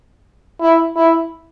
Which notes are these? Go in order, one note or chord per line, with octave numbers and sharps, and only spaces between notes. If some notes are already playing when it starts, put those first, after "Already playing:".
E4
E4